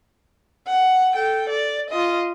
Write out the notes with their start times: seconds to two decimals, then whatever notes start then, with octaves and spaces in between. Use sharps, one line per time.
0.67 F#5
1.14 A4 G5
1.49 D5
1.90 F4 D#5